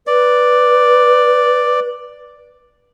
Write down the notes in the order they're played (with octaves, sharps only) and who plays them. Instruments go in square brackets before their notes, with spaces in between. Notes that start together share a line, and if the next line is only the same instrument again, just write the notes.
[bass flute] B4 [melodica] D5